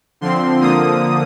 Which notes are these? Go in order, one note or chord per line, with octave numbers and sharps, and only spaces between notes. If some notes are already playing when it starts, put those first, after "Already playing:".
D3 F3 C4 C6
D3 F3 A#3 D#6